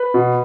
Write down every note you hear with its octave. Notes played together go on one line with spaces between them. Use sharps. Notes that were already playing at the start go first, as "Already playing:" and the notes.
Already playing: B4
B2